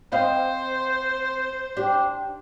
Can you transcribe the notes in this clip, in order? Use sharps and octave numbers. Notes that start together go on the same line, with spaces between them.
C4 C5 D#5 F5
D4 G4